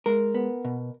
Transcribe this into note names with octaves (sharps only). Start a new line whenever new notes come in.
G#3 A#4
B3
B2